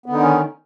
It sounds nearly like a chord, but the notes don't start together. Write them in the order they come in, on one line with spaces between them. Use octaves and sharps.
B3 D3 D#4 D#3 C#4